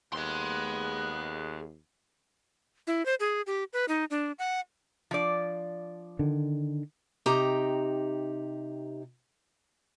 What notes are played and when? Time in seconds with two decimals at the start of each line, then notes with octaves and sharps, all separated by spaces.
0.14 D#2 B3 G#4 C6 F#6
2.87 E4
3.06 C5
3.20 G#4
3.47 G4
3.73 B4
3.88 D#4
4.11 D4
4.39 F#5
5.11 F3 D4 D5
6.19 D3 D#3
7.26 C3 D#4 G4 A#5